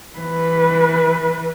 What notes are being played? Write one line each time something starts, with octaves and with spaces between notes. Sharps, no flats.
E3 B4